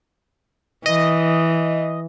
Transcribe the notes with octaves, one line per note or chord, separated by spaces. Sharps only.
E3 D#5